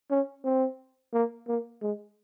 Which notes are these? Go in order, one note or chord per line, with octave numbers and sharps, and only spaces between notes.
C#4
C4
A#3
A#3
G#3